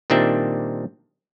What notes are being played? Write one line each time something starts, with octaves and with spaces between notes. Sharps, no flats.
A#2 D#3 G3 C4 D4 E5